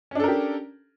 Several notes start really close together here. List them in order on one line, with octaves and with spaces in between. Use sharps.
C#4 D4 A4 A#4 G4